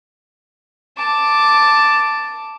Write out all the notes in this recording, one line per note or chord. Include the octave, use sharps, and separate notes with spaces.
A5 D6